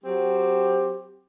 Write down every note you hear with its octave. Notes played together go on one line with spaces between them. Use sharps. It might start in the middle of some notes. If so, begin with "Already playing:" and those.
F#3 C4 G4